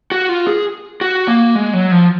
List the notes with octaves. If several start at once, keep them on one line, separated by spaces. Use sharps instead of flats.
F#4
F4
G#4
F#4
A#3
G#3
F#3
F3